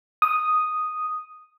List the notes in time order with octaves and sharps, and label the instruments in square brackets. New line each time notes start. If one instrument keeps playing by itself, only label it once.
[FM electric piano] D#6